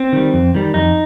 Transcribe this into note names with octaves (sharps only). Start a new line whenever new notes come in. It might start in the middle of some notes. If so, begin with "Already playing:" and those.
Already playing: C4
D#3 G3
F2
D#3 G3
F2 D#4